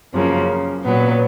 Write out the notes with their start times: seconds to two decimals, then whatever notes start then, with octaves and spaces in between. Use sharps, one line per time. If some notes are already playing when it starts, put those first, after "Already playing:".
0.13 F#2 C#3 F3 A#3
0.84 A#2 F#3 B3